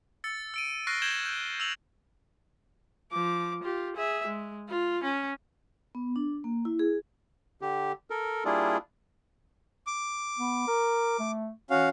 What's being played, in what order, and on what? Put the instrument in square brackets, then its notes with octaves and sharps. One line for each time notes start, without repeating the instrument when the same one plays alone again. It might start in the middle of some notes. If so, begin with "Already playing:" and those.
[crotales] E6 A6 C#7
E6 D7 D#7
C#6 F6 F#6 A6 A#6 C7
G6 G#6 E7 F#7 G7
G6
E6 F7 F#7
[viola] F3 D6
F4 G4
G#4 E5
G#3
F4
C#4
[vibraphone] B3
D4
A#3
E4
G#4
[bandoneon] D3 G4
A4 A#4
G3 A#3 D4 E4 F4 G#4
[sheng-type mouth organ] D6
[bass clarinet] B3
A#4
A3
[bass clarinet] E3 [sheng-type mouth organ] C#4 F#4 F5